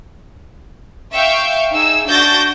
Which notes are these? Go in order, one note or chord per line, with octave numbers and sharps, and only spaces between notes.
E5 F5 G5 C#6
D#4 G#4 E6
D4 F#4 G6 A6 A#6